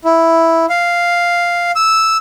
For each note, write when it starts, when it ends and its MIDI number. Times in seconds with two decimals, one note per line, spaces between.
0.04 0.66 64
0.69 1.71 77
1.76 2.17 88